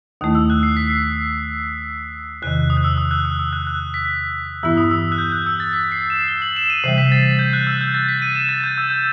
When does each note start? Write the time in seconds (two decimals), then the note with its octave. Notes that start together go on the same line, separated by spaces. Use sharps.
0.21 D#2 D#3 A3 E4 D#6
0.35 E6
0.50 F#6
0.63 C7
0.77 B6
0.90 C7
2.42 E2 C3 D#3 F#6
2.70 D#6
2.77 F#6
2.84 E6
2.97 D#6
3.11 F#6
3.25 E6
3.39 E6
3.53 F#6
3.67 F#6
3.94 B6
4.63 G2 E3 B3 E4 E6
4.77 D#6
4.91 E6
5.12 F#6
5.18 G6
5.32 F#6
5.46 E6
5.60 A6
5.73 B6
5.92 C7
6.10 E7
6.28 G7
6.42 F#7
6.56 E7
6.70 D#7
6.84 C3 E3 G3 C7
6.98 B6
7.12 A6
7.25 B6
7.39 G6
7.53 F#6
7.67 E6
7.81 G6
7.94 A6
8.08 B6
8.22 D#7
8.35 E7
8.49 A6
8.64 G6
8.78 E6
8.90 G6